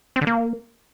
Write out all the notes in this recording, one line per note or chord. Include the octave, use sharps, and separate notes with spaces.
C4
D3
A#3